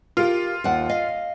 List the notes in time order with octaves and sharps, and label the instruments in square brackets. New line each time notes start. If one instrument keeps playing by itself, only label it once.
[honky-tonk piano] F4 [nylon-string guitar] G4 A#4
[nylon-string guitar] D#2 F#5
D#5 F5